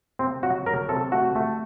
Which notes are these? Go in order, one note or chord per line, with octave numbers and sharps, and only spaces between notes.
C3 C4
F#3 F#4
F#3 A#4
C3 A4
A3 F#4
A3